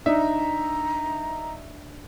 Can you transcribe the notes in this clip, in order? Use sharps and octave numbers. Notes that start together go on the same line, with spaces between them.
D4 D#4 E5 A#5